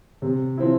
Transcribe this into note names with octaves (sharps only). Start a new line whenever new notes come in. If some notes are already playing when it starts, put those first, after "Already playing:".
C3
F3 C4 E4